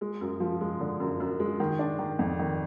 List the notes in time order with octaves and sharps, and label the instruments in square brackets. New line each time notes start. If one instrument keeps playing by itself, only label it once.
[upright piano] G#3
F#2
F3
G#3
D3
F#2
F#2
G#3
D#3
D4
D#3
F2
D#3